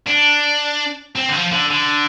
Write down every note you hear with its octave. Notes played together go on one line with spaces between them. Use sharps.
D4
C4
D3
F3
D3
D3